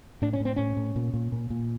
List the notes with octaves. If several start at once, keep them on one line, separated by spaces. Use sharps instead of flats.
A2 D4
C#4
A2
C4
A2 C#4
A2
A#2
A#2
A#2
A#2